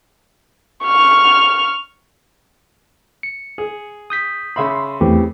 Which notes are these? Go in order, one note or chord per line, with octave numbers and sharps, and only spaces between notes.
C#6 F6
C#7
G#4
D#6 G6 B6
C#3 E5 B5 C6
E2 E3 A3 C4 G4